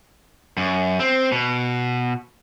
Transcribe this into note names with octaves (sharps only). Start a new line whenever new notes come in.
F#2
C4
B2